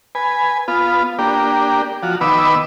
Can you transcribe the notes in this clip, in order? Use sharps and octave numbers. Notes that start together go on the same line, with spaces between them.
B4 G#5
B3 F4
A#3 D4 G4
F3 F#4
D#3 B3 B4 D6 E6